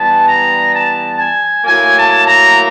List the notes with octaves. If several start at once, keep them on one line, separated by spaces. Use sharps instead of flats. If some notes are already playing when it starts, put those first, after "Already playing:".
Already playing: E3 G3 B3 A5
A#5
A5
G#5
A2 F#3 A#3 G#5
A5
A#5